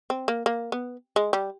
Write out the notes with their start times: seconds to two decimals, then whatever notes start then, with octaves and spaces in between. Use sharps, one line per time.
0.10 C4
0.28 A#3
0.46 A#3
0.72 B3
1.16 G#3
1.33 G3